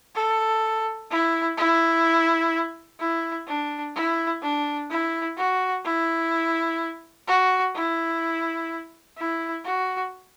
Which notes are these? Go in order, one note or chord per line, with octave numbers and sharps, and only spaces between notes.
A4
E4
E4
E4
D4
E4
D4
E4
F#4
E4
F#4
E4
E4
F#4